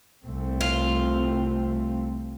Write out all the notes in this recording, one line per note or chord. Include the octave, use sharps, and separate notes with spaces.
C2 A3 C4
F4